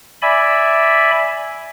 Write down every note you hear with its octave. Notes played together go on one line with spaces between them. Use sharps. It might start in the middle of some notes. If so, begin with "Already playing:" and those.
D5 E5 G#5 B5